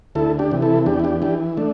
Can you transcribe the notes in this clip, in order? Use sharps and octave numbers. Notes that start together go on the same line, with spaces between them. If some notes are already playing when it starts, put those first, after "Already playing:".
D2 E4 A4
D4 G4
C3 E3
E4 A4
E2 D4 G4
E4
D4 G4
E3 D4 G4
A3 D4